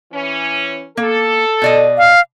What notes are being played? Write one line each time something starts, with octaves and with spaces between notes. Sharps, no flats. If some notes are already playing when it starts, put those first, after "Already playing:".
E3 C#4
A#3 A4
B2 D5 D#5
F5